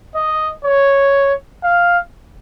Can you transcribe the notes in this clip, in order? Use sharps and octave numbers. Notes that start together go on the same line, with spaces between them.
D#5
C#5
F5